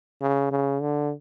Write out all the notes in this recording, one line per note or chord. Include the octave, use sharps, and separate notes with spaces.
C#3
C#3
D3